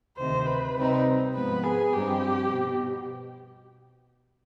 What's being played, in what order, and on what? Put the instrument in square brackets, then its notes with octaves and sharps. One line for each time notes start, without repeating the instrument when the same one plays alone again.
[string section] D2 C3 D#3 [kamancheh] C5
[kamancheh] B4
[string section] C3 G3 C4 D#4
[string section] G#2 F3 B3 [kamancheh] B4
[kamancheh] G#4
[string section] G2 F3 C4 D#4 [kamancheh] G4
[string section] B2